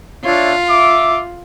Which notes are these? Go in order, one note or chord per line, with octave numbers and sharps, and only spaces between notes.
D4 F4 C#5 E5
E5 D6